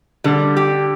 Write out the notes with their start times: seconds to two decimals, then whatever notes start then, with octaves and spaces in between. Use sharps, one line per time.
0.24 D3 G3
0.57 G4